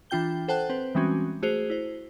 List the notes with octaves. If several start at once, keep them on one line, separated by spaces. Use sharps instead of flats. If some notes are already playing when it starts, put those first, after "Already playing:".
E3 D4 F4 G5 G6 G7
A4 C5 F#5 G5 A5 F#6
C4 B4 C5
E3 G3 G#3 C4 C#4 F#4
A3 F#4 G#4 C5 F7
E4 C5